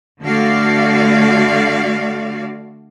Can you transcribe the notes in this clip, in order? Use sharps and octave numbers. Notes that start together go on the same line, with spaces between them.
D3 A3 F#4 D5 F5